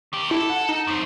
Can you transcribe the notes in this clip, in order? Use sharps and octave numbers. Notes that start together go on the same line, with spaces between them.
D#3 G4
E4 A4
F#5
D#4
F#2 C4